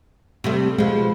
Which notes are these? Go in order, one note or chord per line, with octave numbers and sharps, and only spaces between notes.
C3 G3 A3
B2 F3 G#3